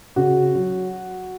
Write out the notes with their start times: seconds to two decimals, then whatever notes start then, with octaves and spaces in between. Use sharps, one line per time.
0.16 C#3 F#4
0.55 F#3